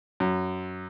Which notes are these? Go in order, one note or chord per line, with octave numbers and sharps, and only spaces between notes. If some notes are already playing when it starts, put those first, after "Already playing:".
F#2